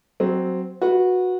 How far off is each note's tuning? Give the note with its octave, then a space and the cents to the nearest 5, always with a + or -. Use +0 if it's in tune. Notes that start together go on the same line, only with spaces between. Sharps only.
F#3 +5 C4 +0
F#4 -15 B4 -15